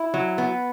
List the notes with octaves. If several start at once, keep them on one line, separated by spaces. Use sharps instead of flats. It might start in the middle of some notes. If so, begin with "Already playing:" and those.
Already playing: E4
F#3
B3